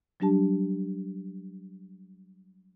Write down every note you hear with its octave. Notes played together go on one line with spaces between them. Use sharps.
F#3 G3 D4 G4 A5